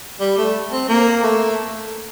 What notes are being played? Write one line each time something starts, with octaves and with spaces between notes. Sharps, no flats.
G3
A3
C4
A#3
A3